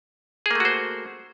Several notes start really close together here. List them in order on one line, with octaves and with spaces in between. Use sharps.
G#4 A#3 A3 F#4 C5